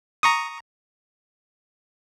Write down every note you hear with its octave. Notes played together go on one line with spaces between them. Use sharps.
A#5 C#6 D#6